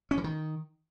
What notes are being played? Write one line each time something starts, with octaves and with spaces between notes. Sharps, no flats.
C#4
E3
D#3